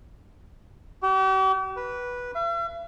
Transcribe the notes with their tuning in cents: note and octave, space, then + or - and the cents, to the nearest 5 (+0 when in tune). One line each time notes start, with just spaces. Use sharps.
G4 -45
B4 -10
E5 +45